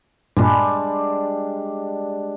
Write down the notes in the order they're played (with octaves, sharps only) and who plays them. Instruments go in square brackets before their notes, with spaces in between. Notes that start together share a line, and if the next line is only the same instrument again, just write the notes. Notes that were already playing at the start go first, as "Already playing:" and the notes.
[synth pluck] G2 A#2 [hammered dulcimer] G3 G#3 D4